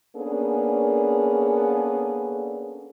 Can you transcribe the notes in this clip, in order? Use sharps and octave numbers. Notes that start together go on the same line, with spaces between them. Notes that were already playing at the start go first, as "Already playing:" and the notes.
A#3 B3 C#4 D4 G#4 A4